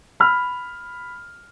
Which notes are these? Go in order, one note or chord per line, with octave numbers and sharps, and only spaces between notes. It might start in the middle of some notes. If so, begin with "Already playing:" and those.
B5 F6